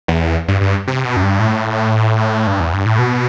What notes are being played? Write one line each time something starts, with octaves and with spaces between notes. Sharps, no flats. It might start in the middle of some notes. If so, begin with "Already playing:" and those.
E2
G2
G2
C3
B2
F#2
G2
A2
G2
E2
G2
A2
B2